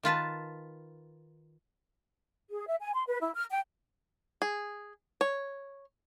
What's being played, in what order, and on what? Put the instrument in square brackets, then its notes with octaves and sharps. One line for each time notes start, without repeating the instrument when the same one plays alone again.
[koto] D#3 F4 B4 A5
[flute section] G#4
E5
G#5
C6
B4
E4
F6
G5
[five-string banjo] G#4
C#5